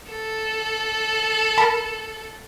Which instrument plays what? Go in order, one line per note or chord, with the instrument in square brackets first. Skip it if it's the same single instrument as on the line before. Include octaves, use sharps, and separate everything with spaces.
[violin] A4
[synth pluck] A#4 A5 B5